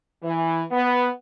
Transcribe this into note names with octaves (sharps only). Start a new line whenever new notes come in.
E3
B3